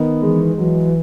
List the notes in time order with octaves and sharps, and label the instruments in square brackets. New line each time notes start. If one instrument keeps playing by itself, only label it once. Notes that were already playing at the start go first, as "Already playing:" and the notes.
Already playing: [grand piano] D#3 B3
[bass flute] E3 [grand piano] G#3
[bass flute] E3 [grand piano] F#3